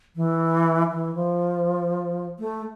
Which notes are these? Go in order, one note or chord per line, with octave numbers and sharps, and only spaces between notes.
E3
E3
F3
A3